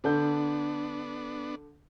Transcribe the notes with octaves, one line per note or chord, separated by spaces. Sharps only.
D3 B3 D4 A4 G6